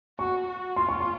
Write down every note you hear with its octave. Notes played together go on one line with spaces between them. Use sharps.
F#4 C#6
F#4
F4 C6
C#6
C6